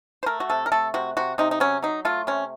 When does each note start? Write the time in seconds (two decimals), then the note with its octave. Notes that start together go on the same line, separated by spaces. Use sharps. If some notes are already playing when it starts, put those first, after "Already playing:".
0.23 C5
0.26 A3 A#4
0.40 F#4
0.50 C3 A4
0.66 A#4
0.72 A3 A4
0.94 C3 F#4
1.17 C3 F#4
1.38 C3 D#4
1.51 D#4
1.60 F#3 C#4
1.82 F#3 D#4
2.05 A3 F4
2.27 C3 C#4